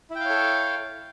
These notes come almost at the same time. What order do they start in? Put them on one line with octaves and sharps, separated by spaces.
E4 G5 F5 C#5 A4